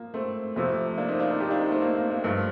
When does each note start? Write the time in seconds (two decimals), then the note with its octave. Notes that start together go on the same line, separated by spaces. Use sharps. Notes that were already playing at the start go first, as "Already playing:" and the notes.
Already playing: F3 A#3
0.14 A3 C4
0.56 F2 C3 F3 A3 C4
0.97 A#3 D4
1.09 C4 D#4
1.19 D4 F4
1.29 C4 D#4
1.40 D#4 G4
1.51 D4 F4
1.61 C4 D#4
1.71 A3 C4
1.82 A#3
1.97 A#3
2.10 A#3
2.24 G2 F3 A3